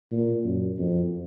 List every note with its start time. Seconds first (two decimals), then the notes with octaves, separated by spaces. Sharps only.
0.12 A#2
0.44 F#2
0.78 F2